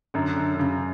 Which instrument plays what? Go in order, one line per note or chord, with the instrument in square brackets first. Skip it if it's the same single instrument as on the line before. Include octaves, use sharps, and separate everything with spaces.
[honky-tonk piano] F#2 [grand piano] D3
[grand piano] D3
D3
[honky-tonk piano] F#2 [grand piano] C#3